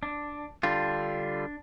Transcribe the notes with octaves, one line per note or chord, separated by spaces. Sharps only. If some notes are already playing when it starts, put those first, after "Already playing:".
D4
D3 G3 D4 F4